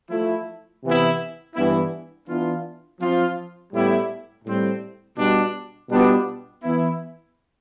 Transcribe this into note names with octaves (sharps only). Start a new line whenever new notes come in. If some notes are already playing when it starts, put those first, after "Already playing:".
F3 A3 E4
C3 E3 B3 E4
G2 E3 B3 E4
E3 B3 D4 F4
F3 C4 F4
A2 G3 B3 E4
A2 G3 C4
B2 G3 D4
B2 G3 B3 D4 F4
E3 B3 E4